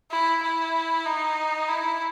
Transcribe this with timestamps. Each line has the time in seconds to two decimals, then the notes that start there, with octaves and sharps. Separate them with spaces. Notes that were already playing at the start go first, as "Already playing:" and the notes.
0.11 E4
0.43 E4
1.06 D#4
1.68 E4